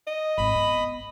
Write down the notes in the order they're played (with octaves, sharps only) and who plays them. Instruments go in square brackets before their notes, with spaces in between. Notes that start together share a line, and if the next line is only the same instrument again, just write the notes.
[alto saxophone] D#5
[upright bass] G#1 [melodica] B5
[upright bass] B3